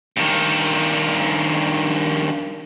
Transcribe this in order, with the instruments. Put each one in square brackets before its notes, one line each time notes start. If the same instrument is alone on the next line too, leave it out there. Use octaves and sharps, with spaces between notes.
[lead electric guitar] G2 D#3